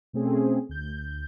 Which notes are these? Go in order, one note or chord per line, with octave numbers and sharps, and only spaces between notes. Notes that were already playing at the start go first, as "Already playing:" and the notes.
B2 A3 C4 C#4 G#4
D2 G6